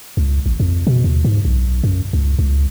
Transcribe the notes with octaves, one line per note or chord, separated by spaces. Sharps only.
C#2
A1
F2
B2
D#2
G#2
B1
F#2
C#2
C#2